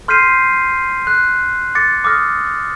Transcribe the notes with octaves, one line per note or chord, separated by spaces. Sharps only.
C6 F6 G6 B6 C7 D#7
F#6
D6 A6 A#6 C#7
D6 D#6 F6 A#6